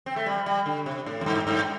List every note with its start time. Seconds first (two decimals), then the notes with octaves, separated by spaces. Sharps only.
0.06 C4
0.16 A3
0.26 G3
0.46 G3
0.66 D3
0.86 C3
1.06 A2
1.21 E2
1.26 G2
1.47 G2